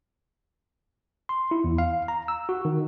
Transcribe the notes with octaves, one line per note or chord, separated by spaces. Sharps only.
C6
E4
E2
F5
A#5
E6
F#4
D#3